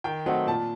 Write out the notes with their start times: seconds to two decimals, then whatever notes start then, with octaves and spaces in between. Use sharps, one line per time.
0.04 D#3 G5
0.26 F#3 A3 C4 D#4 F#5
0.46 A#2 A5